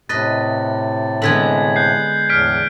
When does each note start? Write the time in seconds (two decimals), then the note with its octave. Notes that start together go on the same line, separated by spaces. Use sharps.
0.09 A2 C3 B4 D#5 A6
1.22 D3 G#3 B3 G#6 B6 F#7
1.76 F#6 G6 C7
2.30 E2 A2 D5 F6 B6 D7